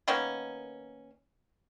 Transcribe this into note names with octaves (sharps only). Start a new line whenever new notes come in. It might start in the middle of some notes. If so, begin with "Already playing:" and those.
D#3 A#3 B3 C#4